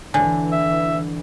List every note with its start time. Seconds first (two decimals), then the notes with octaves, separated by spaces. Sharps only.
0.14 D3 E3 G#5
0.52 E5